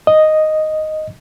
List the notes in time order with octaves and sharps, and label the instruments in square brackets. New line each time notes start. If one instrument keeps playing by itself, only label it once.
[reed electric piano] D#5